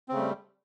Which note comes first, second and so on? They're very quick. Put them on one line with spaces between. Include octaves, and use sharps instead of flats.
C4 C#3 A3 G3